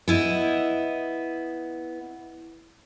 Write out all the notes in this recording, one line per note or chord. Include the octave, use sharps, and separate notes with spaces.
B3 E4 D#5